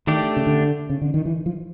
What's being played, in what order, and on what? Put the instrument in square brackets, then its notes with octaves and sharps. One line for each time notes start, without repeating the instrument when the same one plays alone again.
[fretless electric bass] D#3 [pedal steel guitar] A3 D4 G4
[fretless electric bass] C#3
D3
C#3
D3
D#3
E3
F3